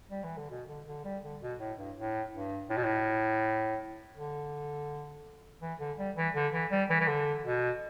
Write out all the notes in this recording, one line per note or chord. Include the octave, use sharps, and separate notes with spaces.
G3
E3
D3
B2
D3
D3
G3
D3
B2
A2
G2
A2
G2
A2
B2
A2
D3
E3
D3
G3
E3
D3
E3
G3
E3
E3
D3
B2